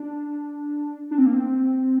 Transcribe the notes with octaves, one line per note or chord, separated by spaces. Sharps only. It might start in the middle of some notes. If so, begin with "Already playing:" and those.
Already playing: D4
D4
C4
A#3
C4